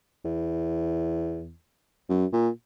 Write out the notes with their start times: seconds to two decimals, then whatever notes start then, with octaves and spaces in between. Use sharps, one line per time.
0.24 E2
2.09 F#2
2.33 A#2